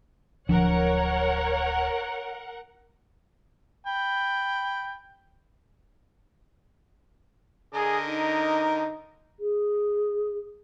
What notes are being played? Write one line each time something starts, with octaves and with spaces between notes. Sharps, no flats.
D1 F3 D4 A#4 C#5 F#5
G5 B5
D3 G#4 A#4 D#5
D#4
G#4